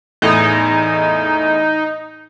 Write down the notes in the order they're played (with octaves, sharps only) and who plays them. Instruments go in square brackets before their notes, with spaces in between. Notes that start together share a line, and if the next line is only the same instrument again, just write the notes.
[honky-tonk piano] E2 A2 [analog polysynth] D#4